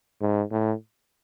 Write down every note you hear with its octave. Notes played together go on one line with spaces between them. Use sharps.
G#2
A2